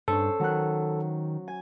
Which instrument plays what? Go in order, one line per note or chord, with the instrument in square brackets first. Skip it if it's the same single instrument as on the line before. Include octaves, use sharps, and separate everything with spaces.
[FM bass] G2 [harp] C#4 C5 [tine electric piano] A4
[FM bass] D#3 [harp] F#3 F#6
[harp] G#5